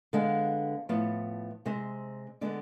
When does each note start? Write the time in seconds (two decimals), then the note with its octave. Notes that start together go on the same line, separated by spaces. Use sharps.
0.13 D3 G#3 B3 F5
0.89 A2 F3 B3
1.65 C3 G#3 C4
2.41 D3 G#3 B3 D5